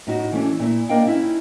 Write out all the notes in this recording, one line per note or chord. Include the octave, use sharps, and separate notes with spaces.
A2 D#4 F#4
E3 A3 C#4 D4
A#2 E4
A#3 D4 A#4 D#5 F5 G5
C#4 D#4 E4